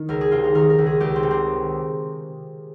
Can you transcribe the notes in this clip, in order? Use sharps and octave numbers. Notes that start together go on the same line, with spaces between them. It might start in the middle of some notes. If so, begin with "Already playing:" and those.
Already playing: D#3
C#2 A#4
G#4
C3 F4
D#4
D#3 A#4
A#4
C#2
G#4
C#2 G4
C4
C3
C4